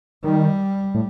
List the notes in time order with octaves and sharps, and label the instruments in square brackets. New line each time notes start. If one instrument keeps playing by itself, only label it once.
[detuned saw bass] D#3 [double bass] G3
[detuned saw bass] A2